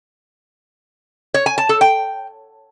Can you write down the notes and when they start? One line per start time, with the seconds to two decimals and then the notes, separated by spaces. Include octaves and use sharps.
1.34 C#5
1.46 G#5
1.58 A5
1.69 A4
1.81 G5